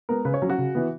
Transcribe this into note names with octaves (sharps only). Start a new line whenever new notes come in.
G#3 B3 A#4
C#3 B4
C#5
F#3 C#4
F#4
C#3
E3 B3